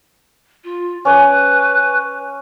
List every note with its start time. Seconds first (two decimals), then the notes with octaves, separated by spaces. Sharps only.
0.64 F4
1.05 C#4 B4 D6